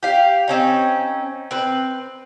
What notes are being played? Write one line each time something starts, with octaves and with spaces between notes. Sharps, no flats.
G4 F5
C4 C#4 D#4
C4 B4